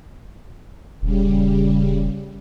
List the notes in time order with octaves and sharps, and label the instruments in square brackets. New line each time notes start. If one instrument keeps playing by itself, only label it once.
[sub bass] D#1 [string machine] C#3 G3